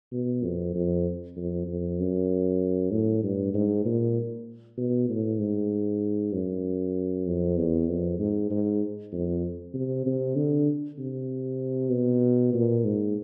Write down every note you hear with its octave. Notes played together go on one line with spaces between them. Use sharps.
B2
F2
F2
F2
F2
F#2
A2
G2
G#2
A#2
B2
A2
G#2
F#2
F2
E2
F2
G#2
G#2
F2
C3
C3
D3
C3
B2
A#2
G#2